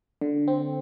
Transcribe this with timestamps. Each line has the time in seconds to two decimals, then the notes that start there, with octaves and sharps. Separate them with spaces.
0.21 D3
0.48 C4